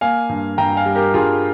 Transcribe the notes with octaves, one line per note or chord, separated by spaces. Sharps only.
A#3 F5 G#5
G2
G2 G5 A#5
F5 G#5
G3
G4 A#4
G2 F4 G#4